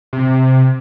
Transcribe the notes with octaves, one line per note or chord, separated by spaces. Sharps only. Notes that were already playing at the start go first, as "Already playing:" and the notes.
C3